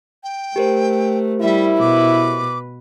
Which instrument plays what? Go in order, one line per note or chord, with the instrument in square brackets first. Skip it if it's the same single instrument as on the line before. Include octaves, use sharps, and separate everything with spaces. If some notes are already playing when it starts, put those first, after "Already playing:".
[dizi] G5
[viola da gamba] A3 [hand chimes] G4 A#4 C5
[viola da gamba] G3 [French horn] E4 [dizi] E5
[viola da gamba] B2 B4 [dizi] D6